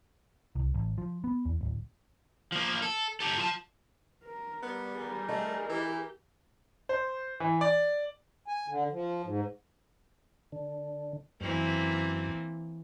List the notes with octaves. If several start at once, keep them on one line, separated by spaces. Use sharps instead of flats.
C2
A1
F3
B3
E2
D1
F3 A#3
A4
G4 A4
F4 A5
A#4
G3 B3
G#4 A#4
A3 D#5
E3 G4
C5
E3
D5
G#5
D3
F3
G#2
D3
F#2 E3 A#3 C4